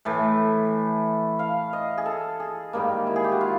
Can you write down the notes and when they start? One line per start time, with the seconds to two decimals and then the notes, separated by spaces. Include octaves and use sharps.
0.05 A2 E3 A3 A5
1.39 F5
1.73 D#5
1.97 G#4
2.06 A4
2.40 G#4
2.73 G#2 D#3 G3 A#3
3.07 E4
3.16 G#4
3.24 G4
3.32 F#4
3.41 F4